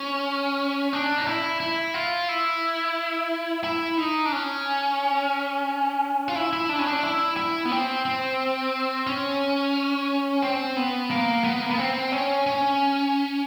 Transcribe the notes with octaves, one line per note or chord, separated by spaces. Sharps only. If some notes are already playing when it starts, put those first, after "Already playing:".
Already playing: C#4
D4
D#4
E4
E4
F4
E4
E4
D#4
D4
C#4
F4
E4
E4
D4
C#4
D4
E4
E4
B3
C4
C4
C#4
C4
B3
A#3
B3
A#3
B3
C4
C#4
C#4